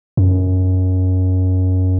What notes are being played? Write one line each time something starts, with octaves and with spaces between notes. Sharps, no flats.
F#2